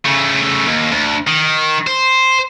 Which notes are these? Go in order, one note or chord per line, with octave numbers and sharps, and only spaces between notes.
C#3 A3
D#2
D2
D#3
C5